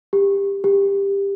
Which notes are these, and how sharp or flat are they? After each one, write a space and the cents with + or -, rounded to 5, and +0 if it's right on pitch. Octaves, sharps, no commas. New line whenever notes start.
G4 +20
G4 +20